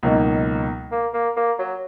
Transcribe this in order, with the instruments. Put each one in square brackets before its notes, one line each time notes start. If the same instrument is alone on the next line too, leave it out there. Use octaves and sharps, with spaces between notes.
[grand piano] C#2 B2 F#3 A#3 D#4
[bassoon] A#3
A#3
A#3
F#3